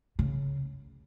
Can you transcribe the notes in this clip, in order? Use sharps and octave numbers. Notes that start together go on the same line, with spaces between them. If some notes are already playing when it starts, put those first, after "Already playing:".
C#3